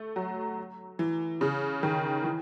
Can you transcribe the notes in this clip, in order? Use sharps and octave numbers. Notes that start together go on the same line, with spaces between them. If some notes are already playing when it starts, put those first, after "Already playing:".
Already playing: A3
F#3
E3
C#3
D#3
E3